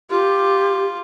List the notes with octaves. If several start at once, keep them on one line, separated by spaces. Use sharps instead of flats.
F4 G4